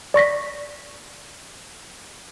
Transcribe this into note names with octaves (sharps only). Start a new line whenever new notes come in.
D5 C#6 A#6 B6